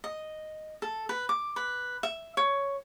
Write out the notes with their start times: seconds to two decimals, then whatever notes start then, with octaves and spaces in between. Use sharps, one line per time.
0.04 D#5
0.82 A4
1.09 B4
1.29 D6
1.56 B4
2.03 E5
2.37 C#5